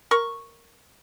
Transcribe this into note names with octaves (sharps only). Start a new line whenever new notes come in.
A#4 C#6